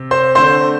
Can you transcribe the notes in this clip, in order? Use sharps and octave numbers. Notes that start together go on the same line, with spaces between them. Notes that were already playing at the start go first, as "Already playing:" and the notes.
Already playing: C3
C5 C6
D3 A3 C4 C5 C6